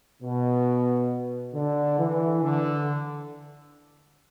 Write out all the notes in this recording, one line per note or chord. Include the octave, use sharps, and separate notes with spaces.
B2
D3
E3
D3